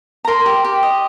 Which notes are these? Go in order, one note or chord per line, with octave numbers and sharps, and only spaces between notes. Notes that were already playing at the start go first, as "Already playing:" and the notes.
A#5
A#4 C6
G4
G4
D#5